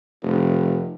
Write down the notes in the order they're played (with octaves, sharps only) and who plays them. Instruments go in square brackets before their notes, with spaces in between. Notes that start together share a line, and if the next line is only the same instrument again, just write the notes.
[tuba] F1